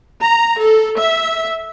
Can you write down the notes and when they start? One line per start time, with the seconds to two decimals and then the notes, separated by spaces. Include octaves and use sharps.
0.21 A#5
0.60 A4
0.98 E5